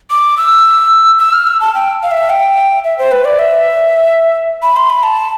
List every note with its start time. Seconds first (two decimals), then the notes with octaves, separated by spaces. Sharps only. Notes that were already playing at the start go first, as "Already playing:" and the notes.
0.10 D6
0.37 E6
1.19 E6
1.33 F6
1.47 E6
1.61 A5
1.75 G5
2.03 F5
2.11 E5
2.30 G5
2.84 E5
2.98 C5
3.11 B4
3.25 D5
3.39 E5
4.62 B5
4.76 C6
4.90 B5
5.03 A5